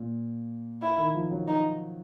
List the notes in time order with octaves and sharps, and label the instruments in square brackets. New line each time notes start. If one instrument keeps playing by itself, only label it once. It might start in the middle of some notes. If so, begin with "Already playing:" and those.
Already playing: [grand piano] A#2
[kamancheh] E4
[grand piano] D#3
F3
F#3
[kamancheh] D#4